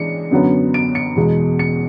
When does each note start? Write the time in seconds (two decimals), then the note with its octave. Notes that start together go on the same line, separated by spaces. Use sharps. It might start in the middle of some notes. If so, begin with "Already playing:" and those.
Already playing: E3 G#3 D4 C#7
0.31 F#2 D3 F#3 B3
0.74 D7
0.95 C#7
1.16 E2 B2 G#3
1.59 C#7